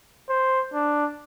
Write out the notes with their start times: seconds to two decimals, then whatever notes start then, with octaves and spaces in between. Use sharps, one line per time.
0.29 C5
0.74 D4